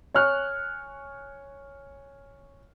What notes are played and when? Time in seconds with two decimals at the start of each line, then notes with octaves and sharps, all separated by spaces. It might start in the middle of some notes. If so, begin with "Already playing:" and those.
0.14 C#5 G#5 C#6 F6 F#6